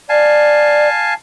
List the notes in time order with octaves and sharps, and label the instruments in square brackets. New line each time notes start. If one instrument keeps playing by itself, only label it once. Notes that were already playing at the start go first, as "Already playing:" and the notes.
[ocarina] D5 [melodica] F5 G#5 A5